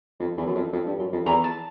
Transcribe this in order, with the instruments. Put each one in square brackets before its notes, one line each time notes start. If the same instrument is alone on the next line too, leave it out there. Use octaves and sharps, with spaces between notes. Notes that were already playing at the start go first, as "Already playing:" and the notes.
[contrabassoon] F2
E2
F#2
F2
F2
G2
F#2
F2
[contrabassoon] E2 [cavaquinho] A#5
[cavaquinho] A5